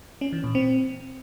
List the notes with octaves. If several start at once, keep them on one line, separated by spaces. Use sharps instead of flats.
C#4
E3
A#2
C4